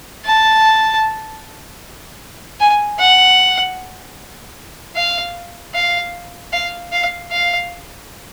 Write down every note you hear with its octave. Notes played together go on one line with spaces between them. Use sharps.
A5
G#5
F#5
F5
F5
F5
F5
F5